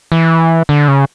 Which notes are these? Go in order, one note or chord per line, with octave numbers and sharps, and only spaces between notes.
E3
D3
C#3